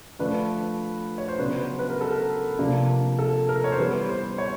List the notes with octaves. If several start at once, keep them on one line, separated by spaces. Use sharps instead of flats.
D3 F3 A3 D4 B4
C#5
C5
C#3 F#3 B3 D4 B4
C5
B4
B4
A#4
A4
A#4
C3 F3 A#3 D4
A4
A#4
C#5
C5
E3 G3 B3 B4
C5
C#5